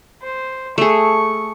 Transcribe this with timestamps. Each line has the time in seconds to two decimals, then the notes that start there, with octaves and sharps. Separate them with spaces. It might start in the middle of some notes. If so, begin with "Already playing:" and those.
0.22 C5
0.78 A3 G#4 C#6